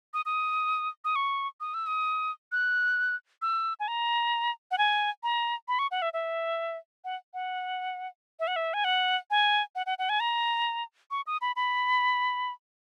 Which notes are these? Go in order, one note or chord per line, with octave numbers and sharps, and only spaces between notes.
D#6
D#6
D#6
C#6
D#6
E6
D#6
F#6
E6
G#5
A#5
F#5
G#5
A#5
B5
C#6
F#5
E5
E5
F#5
F#5
E5
F#5
E5
G#5
F#5
G#5
F#5
F#5
F#5
G#5
A#5
C#6
D#6
B5
B5